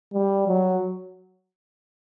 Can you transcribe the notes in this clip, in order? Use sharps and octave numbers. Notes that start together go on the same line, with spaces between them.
G3
F#3